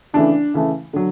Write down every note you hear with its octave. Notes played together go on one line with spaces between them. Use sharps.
C#3 E3 A3 D4
C#3 E3 A3
D3 F#3